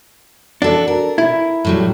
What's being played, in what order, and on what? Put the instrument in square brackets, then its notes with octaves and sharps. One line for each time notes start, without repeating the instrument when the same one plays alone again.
[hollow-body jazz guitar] D4 [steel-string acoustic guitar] F#4 A4
[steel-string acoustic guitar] A#4
[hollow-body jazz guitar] E4
[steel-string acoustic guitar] A2 F#3 G3